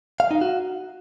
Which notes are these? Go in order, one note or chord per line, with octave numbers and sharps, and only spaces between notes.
F5
D#4
F#4